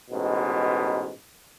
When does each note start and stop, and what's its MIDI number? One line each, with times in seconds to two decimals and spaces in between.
0.10 1.11 33
0.10 1.11 44
0.10 1.11 47